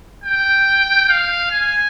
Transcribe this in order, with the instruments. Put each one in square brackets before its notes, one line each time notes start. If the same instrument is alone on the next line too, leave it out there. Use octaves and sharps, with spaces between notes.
[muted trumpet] G5
F5
G#5